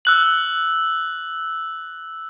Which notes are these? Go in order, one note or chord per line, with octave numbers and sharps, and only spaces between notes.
E6 F#6 F#7